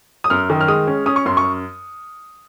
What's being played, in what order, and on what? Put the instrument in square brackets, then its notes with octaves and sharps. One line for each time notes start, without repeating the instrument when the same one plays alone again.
[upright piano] D#6
F#2 F6
D#3
F6
G#3 D#6
C#4
C#4 D#6
C#6
F#2 C6
C#6